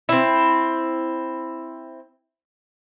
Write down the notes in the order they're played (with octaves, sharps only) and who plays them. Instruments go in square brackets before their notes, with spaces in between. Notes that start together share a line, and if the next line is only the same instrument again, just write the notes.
[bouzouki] C4 E4